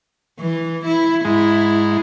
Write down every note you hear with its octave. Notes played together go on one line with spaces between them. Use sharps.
E3
E4
G#2 G#3 E4